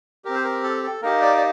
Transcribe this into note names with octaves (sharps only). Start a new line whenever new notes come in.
C4 G4 A#4
C5
A#4
A4
A4
A#3 D#4 G4 A#4
D5
D5